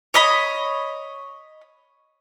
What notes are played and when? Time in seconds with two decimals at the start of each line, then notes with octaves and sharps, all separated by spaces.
0.14 C#5 D#5 B5